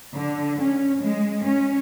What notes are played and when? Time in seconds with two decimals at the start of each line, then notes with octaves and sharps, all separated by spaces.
0.14 D3
0.60 C#4
1.01 G#3
1.44 C#4